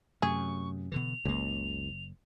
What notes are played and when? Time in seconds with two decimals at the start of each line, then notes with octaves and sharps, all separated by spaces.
0.22 F#2 C3 A3 G#4 C#6
0.92 B2 D3 E3 F7
1.25 F#1 C#2 A#3